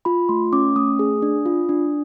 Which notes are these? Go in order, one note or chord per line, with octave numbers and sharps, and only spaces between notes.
F4 B5
A3 C6
C#4 D6
A3 D#6
G#4
D4
F4
D4